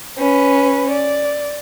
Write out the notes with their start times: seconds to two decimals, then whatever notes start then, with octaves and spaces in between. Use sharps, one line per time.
0.18 C#4 B4
0.90 D5